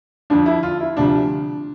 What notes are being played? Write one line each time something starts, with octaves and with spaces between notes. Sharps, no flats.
F2 D3 F3 D4
E4
F4
E4
D2 C3 F3 D4